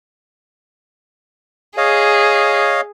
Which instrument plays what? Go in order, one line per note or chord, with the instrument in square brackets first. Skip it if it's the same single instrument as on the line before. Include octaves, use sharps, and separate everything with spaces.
[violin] G#4 [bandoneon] C#5 D#5 F5